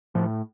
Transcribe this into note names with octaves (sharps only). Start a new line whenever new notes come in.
A2 F3